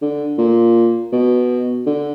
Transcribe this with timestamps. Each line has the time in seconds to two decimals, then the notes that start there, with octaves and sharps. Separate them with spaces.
0.02 D3
0.38 A#2
1.13 B2
1.86 D3